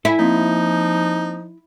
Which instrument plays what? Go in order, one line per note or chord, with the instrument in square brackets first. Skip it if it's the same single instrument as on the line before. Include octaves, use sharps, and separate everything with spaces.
[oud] E4 [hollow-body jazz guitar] A4 E5 G#5
[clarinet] F3 [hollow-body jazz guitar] A#3 C4 [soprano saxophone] D#4